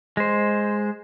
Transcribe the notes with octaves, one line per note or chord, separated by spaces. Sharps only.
G#3 C5